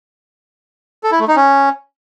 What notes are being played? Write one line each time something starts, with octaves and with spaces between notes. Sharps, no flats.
A4
E4
A3
D#4
C#4